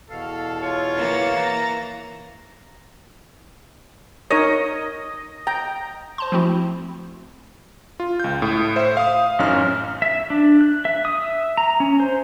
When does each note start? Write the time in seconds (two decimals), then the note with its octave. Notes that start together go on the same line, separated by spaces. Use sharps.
0.10 E2 B2 A4 F5
0.62 F4 C#5
0.95 E3 A#3 A6
1.36 A#5
4.31 D#4 A#4 C#5 D#5
5.47 G5 A#5
6.18 C5 A5 C6
6.32 F3 A3 C4 E4 F#4
8.00 F4
8.20 C#2 G6
8.42 A2
8.76 C5 E5
8.97 F5 D#6
9.39 A1 F#2 C#4 D#4 F6
10.02 E5
10.30 D4
10.61 F#6
10.85 E5
11.05 D#6
11.22 E5
11.57 A#5
11.80 C#4
12.00 C5